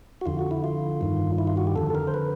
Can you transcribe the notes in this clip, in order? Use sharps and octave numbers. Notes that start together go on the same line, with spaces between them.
F#4
F2 D3 F4
F#4
E4
F4
G2 D#3
E4
F4
F#4
G4
F2 D3 A4
A4
A#4
C5
B4